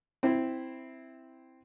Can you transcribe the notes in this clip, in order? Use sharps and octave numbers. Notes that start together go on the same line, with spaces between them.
C4 E4